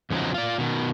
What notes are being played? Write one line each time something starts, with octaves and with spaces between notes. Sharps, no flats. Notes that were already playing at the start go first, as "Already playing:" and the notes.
E2 C#3 F3 F#3 D#4
F4 D5
B2 D#3